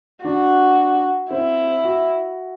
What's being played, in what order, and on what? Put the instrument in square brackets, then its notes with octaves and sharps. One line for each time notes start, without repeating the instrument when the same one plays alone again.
[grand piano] D4 [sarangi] F#4
[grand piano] C4 [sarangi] E4
[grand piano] F#4